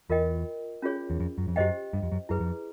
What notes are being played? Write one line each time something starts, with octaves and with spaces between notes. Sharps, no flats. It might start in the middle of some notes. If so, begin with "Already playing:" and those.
E2 F4 A#4 D#5 G5
C#4 F4 G#4 C#5
E2
F2
F#2
F2
F#2 G4 C5 D#5 G5
G2
F2
F#2
F#2 E4 G#4 B4
F2